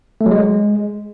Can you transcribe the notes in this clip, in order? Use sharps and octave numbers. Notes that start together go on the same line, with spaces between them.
A3
F#3
G#3